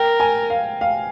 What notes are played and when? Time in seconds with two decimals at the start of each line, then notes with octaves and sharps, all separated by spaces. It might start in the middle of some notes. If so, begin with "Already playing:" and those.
Already playing: A#4 G5
0.20 G#5
0.50 F5
0.81 F5